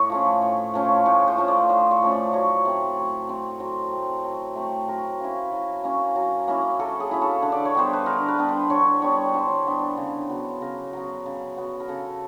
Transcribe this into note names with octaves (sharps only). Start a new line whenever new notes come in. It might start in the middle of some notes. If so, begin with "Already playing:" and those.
Already playing: A2 C#5
F3 A3 C#4
A2
F3 A3 C#4
A2 C#5
C5
F3 A3 C#4
D5
A2 C5
C#5
F3 A3 C#4
D5
F#3 C#5
A3 C4
F#3
A3 C4
F#3 C5
A3 C4
F#3
A3 C4
F#3 A#4
A#3 C#4 E4
F#3
A#3 C#4 E4
F#3
A#3 C#4 E4
F#3 A4
G#4
A#3 C#4 E4
A4
D3
D5
C#5
G3 B3 D4 C5
B4
D3 A#4
B4
G3 B3 D4
C5
D3 C#5
G3 B3 D4 C#5
D3 C5
G3 B3 D4
C#3
F#3 B3
C#3 A#4
F#3 B3
C#3
F#3 B3
A#4
C#3 A4